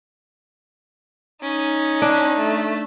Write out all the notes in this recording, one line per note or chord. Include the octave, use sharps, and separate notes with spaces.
C#4 D#4
D4
A3